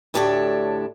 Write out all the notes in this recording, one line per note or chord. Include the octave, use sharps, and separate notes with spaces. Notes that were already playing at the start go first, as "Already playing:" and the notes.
D2 A2 D4 G4 A4 C#5